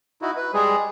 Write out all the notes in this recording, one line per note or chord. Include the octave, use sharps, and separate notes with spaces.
D#4 E4 F#4
B4
G3 G#3 G#4